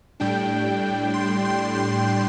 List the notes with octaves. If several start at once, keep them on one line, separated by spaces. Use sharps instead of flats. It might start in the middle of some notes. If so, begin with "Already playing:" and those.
A2 G3 D4 G5
C6
C6
C6